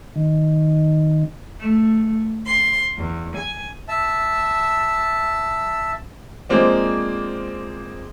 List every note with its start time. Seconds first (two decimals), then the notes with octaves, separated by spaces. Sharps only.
0.16 D#3
1.60 A3
2.46 C6
2.97 E2
3.37 G#5
3.88 E5 A5
6.49 F3 G#3 A#3 C4 D4